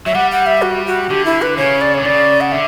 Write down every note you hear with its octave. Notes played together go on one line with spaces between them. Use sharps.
F#3 E5
G3 F#5
F#5
E5
F#4
F#4
D3 G4
E4
B4
C#3 C#5
D5
D3 C#5
C#3 D5
F#5
D3 E5